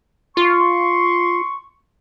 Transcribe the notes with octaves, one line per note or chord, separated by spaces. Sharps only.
F4 C6 C#6